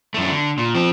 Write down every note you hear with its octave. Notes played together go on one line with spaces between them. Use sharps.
F#2 A3
D3
A#2
F3 C4